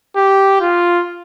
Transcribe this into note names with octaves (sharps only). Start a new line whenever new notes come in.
G4
F4